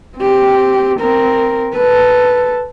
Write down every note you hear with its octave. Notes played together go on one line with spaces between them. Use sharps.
C4 G4
C4 A#4
A4 B4